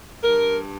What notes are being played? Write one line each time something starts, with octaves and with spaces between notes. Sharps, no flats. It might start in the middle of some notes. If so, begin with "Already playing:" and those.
G2 A#4